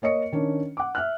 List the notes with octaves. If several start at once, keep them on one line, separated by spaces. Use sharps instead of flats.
A#3 C#5 D#5 C#7
D#3 C#4 D4
F#5 D6
E5 F6 F#6